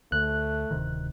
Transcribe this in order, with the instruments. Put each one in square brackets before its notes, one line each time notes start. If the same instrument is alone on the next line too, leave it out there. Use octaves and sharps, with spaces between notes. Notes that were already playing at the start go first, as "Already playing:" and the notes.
[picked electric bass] D2 [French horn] A3 [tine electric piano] F#6
[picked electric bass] D1 C3 D#3